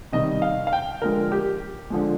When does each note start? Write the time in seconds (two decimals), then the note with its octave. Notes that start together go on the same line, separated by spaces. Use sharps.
0.12 C3 D#3 G3 D#5
0.42 F5
0.67 F5
0.73 G5
1.02 D3 F3 G#3 A#4
1.32 G4
1.90 D3 F3 G#3